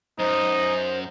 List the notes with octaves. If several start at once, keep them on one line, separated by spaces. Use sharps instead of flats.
F#2 D#4 C5